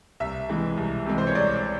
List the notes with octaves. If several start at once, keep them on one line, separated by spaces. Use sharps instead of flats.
C2 E5
C3 E3 G#3
C2
C3 E3 G#3
C5
C#5
C2 D5